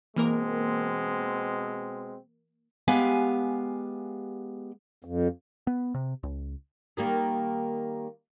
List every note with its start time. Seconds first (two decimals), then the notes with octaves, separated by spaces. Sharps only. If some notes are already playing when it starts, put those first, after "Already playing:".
0.16 B2 E3 G#3 A#3 C4 A#4
2.88 G#3 B3 G4 F5 G#5
5.05 F2
5.67 B3
5.94 C3
6.23 C#2
6.97 D#3 G3 A#3